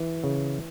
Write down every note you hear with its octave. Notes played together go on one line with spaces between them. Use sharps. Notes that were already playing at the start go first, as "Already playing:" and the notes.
Already playing: E3
C#3